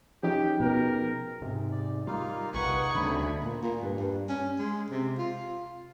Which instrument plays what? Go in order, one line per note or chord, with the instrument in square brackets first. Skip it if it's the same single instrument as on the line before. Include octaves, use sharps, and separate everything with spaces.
[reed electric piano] F3 C#4 D#4 [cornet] G4 [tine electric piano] G#4 G5
[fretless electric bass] B2 [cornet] A#4
[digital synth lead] G#2 [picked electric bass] C3
[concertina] D5
[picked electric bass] G3 [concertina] A#3 D#4 [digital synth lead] F4
[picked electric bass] A#1 C3 [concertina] D#4 G#4 G#5 [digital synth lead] B4 [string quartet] F#5 C#6
[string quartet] D2 [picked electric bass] C#3 G3 C4 [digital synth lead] B5
[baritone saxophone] A#2
A#2
G2
G2
C#4
G#3
C3
F4